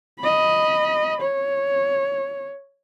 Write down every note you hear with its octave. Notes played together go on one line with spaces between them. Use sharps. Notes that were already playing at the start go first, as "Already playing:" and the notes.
D#5 B5
C#5